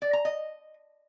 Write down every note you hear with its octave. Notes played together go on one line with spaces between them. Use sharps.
D5
A#5
D#5